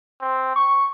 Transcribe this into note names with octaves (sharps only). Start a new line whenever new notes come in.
C4
C#6